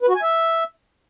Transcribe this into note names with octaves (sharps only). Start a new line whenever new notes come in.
B4
F#4
G#5
E5